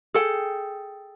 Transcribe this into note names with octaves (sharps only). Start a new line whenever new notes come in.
G#4 A4 G5